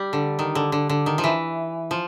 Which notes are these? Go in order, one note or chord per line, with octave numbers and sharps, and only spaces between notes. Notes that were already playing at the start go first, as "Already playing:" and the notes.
Already playing: G3
D3
D#3
D3
D3
D3
D#3
F3
E3
F3